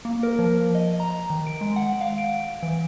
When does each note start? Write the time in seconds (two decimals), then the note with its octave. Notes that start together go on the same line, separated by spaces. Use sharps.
0.05 A#3
0.23 A#4
0.39 F3
0.75 D#5
1.00 A#5
1.30 D#3
1.47 D7
1.61 G#3
1.76 F#5
2.01 F5
2.18 D7
2.63 E3